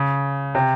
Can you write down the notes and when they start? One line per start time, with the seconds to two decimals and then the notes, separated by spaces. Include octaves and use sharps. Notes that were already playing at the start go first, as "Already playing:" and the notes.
Already playing: C#3
0.55 C3